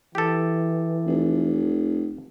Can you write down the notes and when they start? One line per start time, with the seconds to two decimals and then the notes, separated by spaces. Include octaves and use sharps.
0.15 E3 G4 A4
1.06 F1